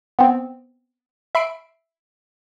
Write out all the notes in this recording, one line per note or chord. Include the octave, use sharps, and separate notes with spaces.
B3 C4
E5 B5 C7 D7